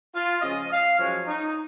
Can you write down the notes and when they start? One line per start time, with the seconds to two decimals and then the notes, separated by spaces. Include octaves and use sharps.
0.14 F4
0.42 C#3 F3 G#3 D#5
0.71 F5
0.98 F#2 F3 G#3 C#5
1.26 D#4